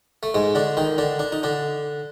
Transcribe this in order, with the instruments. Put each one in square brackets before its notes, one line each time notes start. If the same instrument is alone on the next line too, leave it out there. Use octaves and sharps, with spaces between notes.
[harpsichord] A3
G#2 G#3
D3 D4
D#3 D#4
D3 D4
D4
D#4
D3 D4